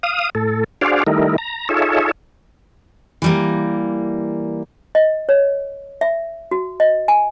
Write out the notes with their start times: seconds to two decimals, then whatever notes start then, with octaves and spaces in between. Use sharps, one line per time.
0.03 F5 D#6
0.35 A2 A4
0.81 D4 F#4 G#4 C5 D5 F5
1.07 D#3 G3 A3 D#4 E4 A#4
1.38 A#5
1.69 D#4 F4 G#4 A4 C#5 E5
3.22 E3 G3 A#3
4.95 D#5
5.29 C#5
6.01 E5
6.51 F#4
6.80 D#5
7.08 G#5